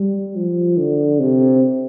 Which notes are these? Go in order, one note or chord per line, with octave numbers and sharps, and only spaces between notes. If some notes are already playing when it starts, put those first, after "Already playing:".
Already playing: G3
F3
D3
C3